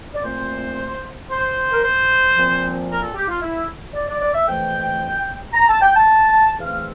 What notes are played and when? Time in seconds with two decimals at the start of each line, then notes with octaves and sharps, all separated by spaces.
0.14 D5
0.23 A#2 A3 C4 C5
1.30 C5
1.72 A#4
1.83 C5
2.35 A#2 F3 C4
2.89 A#4
3.01 A4
3.15 G4
3.28 F4
3.41 E4
3.94 D5
4.08 D5
4.21 D5
4.34 E5
4.47 F2 E3 A3 C4 G5
5.53 A#5
5.67 A5
5.81 G5
5.96 A5
6.60 E2 E3 A3 C4 F5